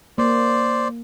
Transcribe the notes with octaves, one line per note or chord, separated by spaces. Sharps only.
A#3 C5 D5